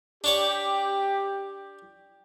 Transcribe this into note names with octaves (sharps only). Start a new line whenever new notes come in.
D4 G4 C#5 D5